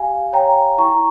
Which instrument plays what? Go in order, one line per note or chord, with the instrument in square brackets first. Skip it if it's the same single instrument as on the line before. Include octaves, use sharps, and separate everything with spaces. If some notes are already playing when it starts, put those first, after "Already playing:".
Already playing: [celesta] G4 F5 G#5
C#5 G5 A#5
E4 A#5 C#6